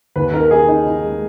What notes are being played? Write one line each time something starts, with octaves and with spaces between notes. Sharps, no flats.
D#2 B4
D#4 A#4
D#4 G#4
D#4
D#4
G#3